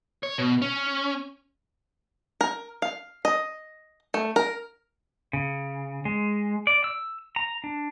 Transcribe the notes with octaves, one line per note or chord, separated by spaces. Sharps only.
C#5
B2
C#4
A#4
F5
D#5
A3
A#4
C#3
G#3
D5
E6
A#5
D4